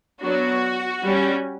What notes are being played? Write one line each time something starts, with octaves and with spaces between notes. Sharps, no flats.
F#3 B3 D4 F#4
G3 C#4